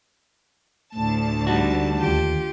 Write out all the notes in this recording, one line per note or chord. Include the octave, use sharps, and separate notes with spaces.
D2 A2 A5
D3 G3 D#4 F#4
D#2 F4 G4